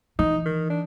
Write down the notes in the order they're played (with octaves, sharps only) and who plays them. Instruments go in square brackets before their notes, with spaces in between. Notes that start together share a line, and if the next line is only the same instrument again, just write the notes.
[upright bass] E3 [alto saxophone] D#4
[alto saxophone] D#3
D4